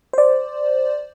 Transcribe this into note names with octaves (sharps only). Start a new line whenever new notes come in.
C5 D5